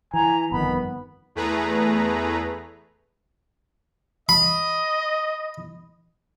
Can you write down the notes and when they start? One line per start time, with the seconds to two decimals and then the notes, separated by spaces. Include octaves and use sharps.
0.14 E3 G#5 A#5
0.52 G1 F2 D#3 B3 B5
1.35 E2 A3 G#4 B4 A#5
4.29 D#5 B5